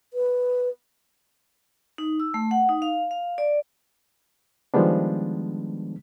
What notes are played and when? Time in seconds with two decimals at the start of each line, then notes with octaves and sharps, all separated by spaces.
0.14 B4
1.98 D#4
2.20 E6
2.34 A3
2.51 F#5
2.69 D#4
2.82 F5
3.11 F5
3.38 D5
4.74 D#3 F3 G3 G#3 B3 D4